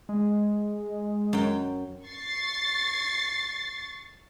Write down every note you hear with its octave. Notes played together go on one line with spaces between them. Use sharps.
G#3
F#2 G5
C#6 A6 C7